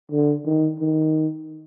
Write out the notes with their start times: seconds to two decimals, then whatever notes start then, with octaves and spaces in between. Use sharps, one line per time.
0.12 D3
0.46 D#3
0.79 D#3